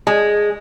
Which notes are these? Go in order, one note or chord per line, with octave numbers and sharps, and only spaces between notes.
G#3